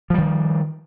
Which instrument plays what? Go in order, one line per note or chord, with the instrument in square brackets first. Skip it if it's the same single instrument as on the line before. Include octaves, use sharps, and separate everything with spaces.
[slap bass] F3
G3
D#3